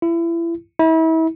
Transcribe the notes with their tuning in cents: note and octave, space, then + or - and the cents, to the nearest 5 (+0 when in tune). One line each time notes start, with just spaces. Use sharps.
E4 +30
E4 -35